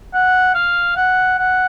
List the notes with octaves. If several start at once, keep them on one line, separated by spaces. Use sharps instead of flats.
F#5
F5
F#5
F#5